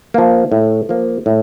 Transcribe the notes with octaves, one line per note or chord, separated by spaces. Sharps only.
F3 A#3
A2
F3 A#3
A2